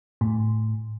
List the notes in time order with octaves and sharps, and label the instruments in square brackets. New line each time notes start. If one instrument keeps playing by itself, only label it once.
[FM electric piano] A2